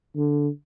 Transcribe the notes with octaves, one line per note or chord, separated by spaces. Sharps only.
D3